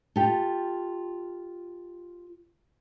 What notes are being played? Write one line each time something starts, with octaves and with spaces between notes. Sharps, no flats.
F4 G4 A4